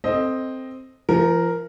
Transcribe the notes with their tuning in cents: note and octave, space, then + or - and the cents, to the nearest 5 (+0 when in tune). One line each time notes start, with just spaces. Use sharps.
C4 +0 A4 +10 D#5 +0
F3 -40 A#4 +0